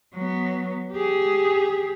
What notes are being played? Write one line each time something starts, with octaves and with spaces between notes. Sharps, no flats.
F#3 B3
G4 G#4